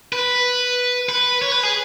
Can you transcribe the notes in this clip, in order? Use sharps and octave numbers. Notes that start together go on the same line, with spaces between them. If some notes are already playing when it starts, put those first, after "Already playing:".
B4
B4
C#5
B4
G#4